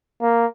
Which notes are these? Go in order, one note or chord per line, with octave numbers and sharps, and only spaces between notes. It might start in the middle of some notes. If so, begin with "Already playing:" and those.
A#3